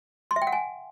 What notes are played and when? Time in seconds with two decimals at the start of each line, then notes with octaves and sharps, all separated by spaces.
0.31 C6
0.36 E5
0.42 G5
0.47 F#5
0.52 G#5